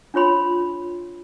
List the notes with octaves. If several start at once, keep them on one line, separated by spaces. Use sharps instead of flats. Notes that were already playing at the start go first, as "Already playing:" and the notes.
D4 F4 C#5 B5 C6